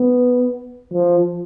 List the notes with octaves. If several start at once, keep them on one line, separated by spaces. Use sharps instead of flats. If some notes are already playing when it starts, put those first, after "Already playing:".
Already playing: B3
F3